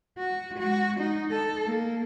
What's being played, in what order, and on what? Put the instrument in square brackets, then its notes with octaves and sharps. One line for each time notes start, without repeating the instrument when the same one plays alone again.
[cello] F#4
G#3 F#4
D#4
A4
A#3